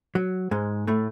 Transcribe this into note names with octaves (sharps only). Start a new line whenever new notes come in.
F#3
G#2 G#3
A2 A3